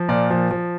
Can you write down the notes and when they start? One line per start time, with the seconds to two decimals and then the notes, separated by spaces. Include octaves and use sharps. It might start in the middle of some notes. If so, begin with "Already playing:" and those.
Already playing: F3
0.09 A#2 A#4 D5
0.30 F3
0.51 F3